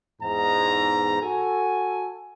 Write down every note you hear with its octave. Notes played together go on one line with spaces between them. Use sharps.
E2 G#2 A#5
F#4 A4 G#5